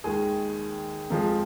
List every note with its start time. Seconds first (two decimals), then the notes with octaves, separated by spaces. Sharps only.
0.04 D#2 D#3 G#3 G#4
1.10 F2 F3 G#3